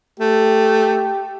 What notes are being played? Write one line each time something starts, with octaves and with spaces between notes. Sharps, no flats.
A3 G4